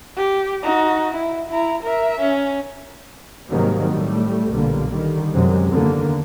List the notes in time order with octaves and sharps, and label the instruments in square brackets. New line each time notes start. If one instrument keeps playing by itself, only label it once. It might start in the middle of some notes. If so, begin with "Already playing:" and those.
[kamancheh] G4
D#4 F#4
E4
E4 A#5
A#4 E5
C#4
[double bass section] G#2 C3 D#3 F#3 G3 A#3
A2 G3 A3
B1 A#2 D3 G3 A#3
D3 D#3 G3
F#2 C3 F#3 G#3
E2 D3 D#3 A#3